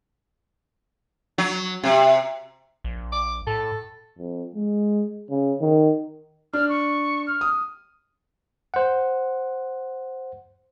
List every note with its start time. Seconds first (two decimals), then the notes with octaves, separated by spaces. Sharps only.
1.38 F#3
1.84 C3
2.84 A#1
3.12 D6
3.47 A2 A4
4.18 F2
4.55 G#3
5.30 C#3
5.61 D#3
6.53 D4 F6
6.69 C#6
7.27 F6
7.41 D#6
8.74 C5 F#5